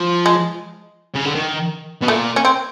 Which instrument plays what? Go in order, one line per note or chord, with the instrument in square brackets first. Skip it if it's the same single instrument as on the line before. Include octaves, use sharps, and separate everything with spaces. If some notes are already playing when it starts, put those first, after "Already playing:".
Already playing: [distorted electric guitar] F3
[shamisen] G#3
[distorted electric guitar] C#3
D3
D#3
B2
[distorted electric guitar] A#2 [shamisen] A3
[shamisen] C#4
C4